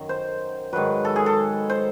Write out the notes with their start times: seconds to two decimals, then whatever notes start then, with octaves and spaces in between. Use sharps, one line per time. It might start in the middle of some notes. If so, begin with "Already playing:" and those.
Already playing: F#2 D#3 F#3
0.09 C5
0.73 G#2 D#3 F#3 B4
1.05 A4
1.16 G#4
1.26 A4
1.70 C5